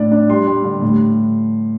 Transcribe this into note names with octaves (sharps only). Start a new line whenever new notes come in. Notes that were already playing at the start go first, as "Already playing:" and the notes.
Already playing: A2 D4 D5
D4
G3 C6
G3
D3
A2